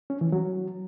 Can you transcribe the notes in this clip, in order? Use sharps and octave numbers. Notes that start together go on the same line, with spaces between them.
C#4
E3
F#3